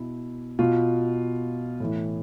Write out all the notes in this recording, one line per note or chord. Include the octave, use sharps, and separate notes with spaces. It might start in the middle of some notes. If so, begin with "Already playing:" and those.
Already playing: B2 E4
B2 F4
A2 E3